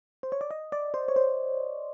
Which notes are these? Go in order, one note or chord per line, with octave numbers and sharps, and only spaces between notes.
C5
C#5
D5
D#5
D5
C5
C#5
C5